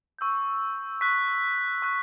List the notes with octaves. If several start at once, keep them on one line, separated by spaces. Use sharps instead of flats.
C#6 E6 G6
C#6 F#6 B6
C#6 F#6